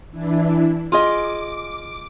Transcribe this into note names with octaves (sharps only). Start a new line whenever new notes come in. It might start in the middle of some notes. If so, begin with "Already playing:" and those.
E3 D4 E4
F4 G#4 D#5 D6